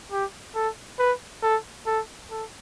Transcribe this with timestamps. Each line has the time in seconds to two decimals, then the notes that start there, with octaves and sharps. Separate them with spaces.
0.12 G4
0.55 A4
0.99 B4
1.43 A4
1.87 A4
2.31 A4